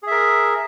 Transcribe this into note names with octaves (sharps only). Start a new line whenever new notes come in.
G#4 A#4 E5